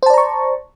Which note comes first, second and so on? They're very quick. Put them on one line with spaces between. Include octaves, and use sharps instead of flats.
C5 A5 D5 A#5 C#6